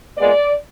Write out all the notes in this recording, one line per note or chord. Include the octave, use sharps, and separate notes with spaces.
A#2 G#3 B3 D5